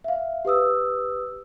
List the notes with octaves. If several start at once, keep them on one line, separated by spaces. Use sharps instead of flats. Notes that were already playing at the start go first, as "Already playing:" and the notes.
E5 F5
G4 B4 D#6 E6